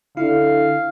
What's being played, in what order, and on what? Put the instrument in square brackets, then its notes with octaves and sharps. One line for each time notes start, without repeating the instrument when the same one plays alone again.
[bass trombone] D3 [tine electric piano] E4 [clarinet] F5